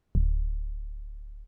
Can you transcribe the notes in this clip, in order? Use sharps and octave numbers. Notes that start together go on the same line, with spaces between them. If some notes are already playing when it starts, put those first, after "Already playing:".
D1